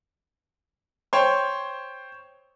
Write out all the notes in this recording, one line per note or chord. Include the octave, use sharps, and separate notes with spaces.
C5 C#5 G5